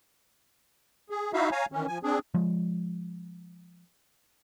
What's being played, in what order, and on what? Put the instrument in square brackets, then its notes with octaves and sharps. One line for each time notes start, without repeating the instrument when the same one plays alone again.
[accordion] G#4
D#4 E4 F#4 E5 F5
C#5 F5 G#5 A#5
D#3 E3 C#4
F3 G#5
C4 D4 G#4
[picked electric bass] F3 G#3